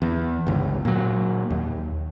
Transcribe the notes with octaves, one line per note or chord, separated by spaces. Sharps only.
E2
G1 C#2
A#2 F#3
D#2